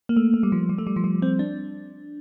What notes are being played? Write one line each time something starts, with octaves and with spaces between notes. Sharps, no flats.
A#3
A3
A3
G3
F3
G3
A3
G3
F3
G3
C4
D4